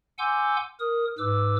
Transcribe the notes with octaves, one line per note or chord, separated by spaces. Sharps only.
F#5 G#5 C6 D6 E6 G6
A#4 D#6
G#2 B4 D6 E6